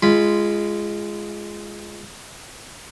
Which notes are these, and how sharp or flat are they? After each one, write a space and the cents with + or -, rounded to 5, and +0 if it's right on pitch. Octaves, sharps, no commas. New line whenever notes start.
G#3 +0 F4 -20 B5 +0